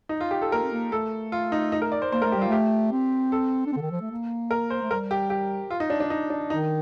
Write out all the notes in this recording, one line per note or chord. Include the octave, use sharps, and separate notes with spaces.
D#4
F4
G4
A4
A#3 A#4
C4
A#3
A3 A4
F4
D#4
D#4
A#4
D5
C5
A#3 C5
A3 A#4
G4
G3
F4
A3 G4
C4
A4
D4
C4
D3
D#3
F3
A3
A#3
A#4
C5
A3
G3 A#4
G4
G4
F4
D#4
D4
D4
D#4
D4
D#3 D#4